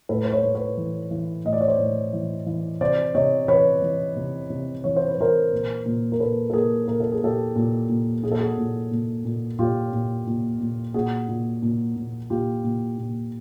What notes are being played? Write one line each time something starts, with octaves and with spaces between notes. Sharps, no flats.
A2 A4 B4
C5
B4 C#5
A2
B4 C#5
E3
E3
A2 D#5
D5
C#5
C5 D5
A2
E3
E3
C3 C5 D5
C3 C#5 D#5
E3 B4 C#5
E3
C3
C3
E3 C#5
C5
B4
E3 A#4 C5
A#2
A#2
A#4
A#2 A4 B4
A4
A#2 G#4 A#4
A#2 A#4
A4
G#4
A#2 G4 A4
A#2
A#2
A#2 G#4
A4
F#4 G#4
A#2
A#2
A#2
A#2 F4 G4
A#2
A#2
A#2
A#2 F#4 G#4
A#2
A#2
A#2
A#2 F4 G4
A#2
A#2